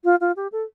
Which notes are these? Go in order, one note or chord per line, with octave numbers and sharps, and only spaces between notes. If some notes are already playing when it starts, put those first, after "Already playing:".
F4
F4
G4
A4